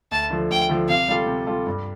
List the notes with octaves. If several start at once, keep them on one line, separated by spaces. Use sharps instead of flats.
D2 A5
D3 F3
D2 G5
D3 F3
C3 F5
G3 F4 A4
C3
G3 F4 A4
G2